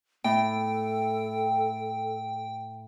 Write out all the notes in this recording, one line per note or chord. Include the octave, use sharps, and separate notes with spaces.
A2 A4 G5